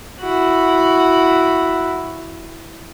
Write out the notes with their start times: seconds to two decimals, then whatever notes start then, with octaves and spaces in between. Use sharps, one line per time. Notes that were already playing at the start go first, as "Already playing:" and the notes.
0.20 E4 F#4